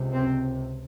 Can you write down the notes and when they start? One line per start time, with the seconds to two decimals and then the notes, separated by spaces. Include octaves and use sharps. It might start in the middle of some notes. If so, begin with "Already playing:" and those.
Already playing: C#2 C3
0.14 C4